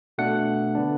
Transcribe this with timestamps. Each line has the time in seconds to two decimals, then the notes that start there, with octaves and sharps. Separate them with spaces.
0.18 B2 A3 D4 F#5
0.75 D3 B3 D4